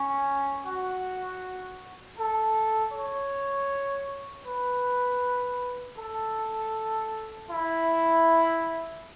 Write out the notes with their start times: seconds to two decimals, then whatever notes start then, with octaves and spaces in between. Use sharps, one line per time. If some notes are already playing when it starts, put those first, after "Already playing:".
Already playing: C#4
0.65 F#4
2.17 A4
2.92 C#5
4.44 B4
5.97 A4
7.49 E4